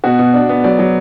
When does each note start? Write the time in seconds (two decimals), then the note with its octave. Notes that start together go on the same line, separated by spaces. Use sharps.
0.04 B2 F#4
0.19 B2
0.34 D4
0.49 B3
0.64 F#3 D5
0.79 F#3